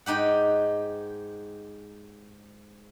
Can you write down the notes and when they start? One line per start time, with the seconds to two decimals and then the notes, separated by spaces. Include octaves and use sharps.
0.06 G#2 D#4 G4 F#5